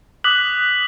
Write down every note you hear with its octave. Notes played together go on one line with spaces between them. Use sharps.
D6 D#6 F#6 B6 F#7